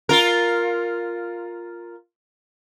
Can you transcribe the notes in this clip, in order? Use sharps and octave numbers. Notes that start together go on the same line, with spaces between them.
F4 A#4